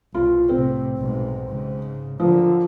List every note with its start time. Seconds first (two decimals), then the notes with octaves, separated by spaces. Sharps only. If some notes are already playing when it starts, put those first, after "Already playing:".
0.14 C2 B2 F4
0.49 A2 C3 C4
0.96 B1 G#2 B2
1.47 G#2 C#3
2.20 D3 F3 F#3 A#3